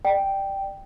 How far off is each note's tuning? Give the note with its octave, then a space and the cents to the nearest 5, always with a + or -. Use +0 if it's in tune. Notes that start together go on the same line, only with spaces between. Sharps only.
D5 +30 G5 +0